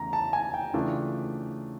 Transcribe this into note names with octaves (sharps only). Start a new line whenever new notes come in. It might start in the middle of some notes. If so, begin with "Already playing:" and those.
Already playing: E2 C#3 A3 A#5
A5
G#5
G5
C#3 E3 A3 D4 F4